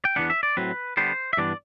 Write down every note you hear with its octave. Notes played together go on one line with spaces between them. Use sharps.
G5
E2 C3 E3 B3 D4 F#5
E5
D5
A2 F#3 C4 B4
D3 G3 B3 C5
E5
G2 E3 B3 D4 D5